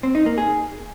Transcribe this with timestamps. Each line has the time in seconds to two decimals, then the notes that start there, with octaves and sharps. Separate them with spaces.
0.03 C4
0.15 D#4
0.26 A#3
0.38 G#4